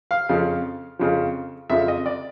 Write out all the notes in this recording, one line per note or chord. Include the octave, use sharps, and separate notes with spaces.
F5
F2 C#3 F3
F2 C#3 F3
F2 C#3 F3 E5
D#5
D5